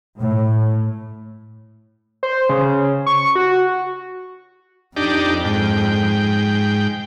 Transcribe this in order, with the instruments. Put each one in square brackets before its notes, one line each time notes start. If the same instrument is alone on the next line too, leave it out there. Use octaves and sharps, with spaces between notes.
[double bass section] A2
[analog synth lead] C5
C#3
C#6
F#4
[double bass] F2 [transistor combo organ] D4 D#4 G4
[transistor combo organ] G#2 G5